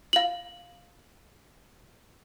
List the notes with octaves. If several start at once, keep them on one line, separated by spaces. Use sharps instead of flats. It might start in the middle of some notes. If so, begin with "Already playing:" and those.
F5 F#7